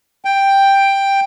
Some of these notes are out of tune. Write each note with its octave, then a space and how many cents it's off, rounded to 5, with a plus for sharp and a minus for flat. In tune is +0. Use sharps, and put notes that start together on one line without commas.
G5 +5